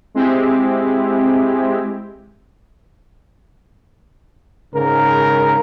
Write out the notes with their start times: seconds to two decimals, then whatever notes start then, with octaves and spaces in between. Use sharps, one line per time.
0.14 G#3 C4 E4 G4
4.74 G#2 C#3 A#4